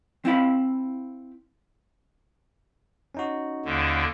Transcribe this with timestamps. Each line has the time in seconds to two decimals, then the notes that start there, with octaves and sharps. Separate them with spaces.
0.25 C4 E4 F5 B5
3.15 C#4 D#4 F#4
3.65 D#2 D3